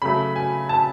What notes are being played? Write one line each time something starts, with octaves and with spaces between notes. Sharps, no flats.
C#3 F#3 A3 B5
G#5
A5